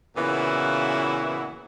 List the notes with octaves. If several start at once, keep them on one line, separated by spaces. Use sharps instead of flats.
A#2 C#3 E3 B3 E4 F#4